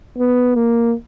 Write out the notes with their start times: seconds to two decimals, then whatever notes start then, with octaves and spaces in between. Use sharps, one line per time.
0.18 B3
0.55 A#3